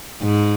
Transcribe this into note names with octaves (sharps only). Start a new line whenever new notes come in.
G#2